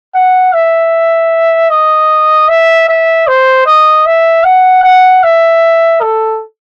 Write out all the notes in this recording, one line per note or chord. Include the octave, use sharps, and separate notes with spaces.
F#5
E5
D#5
E5
E5
C5
D#5
E5
F#5
F#5
E5
A4